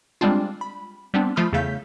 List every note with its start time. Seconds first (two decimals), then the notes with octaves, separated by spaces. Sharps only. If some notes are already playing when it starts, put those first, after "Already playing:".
0.21 G3 G#3 C4 D4 F4
0.61 B5
1.14 G3 B3 C4 D4
1.36 F3 A3 F4 B5 D#6 F6
1.53 E2 C#3 A3 F5 G6 B6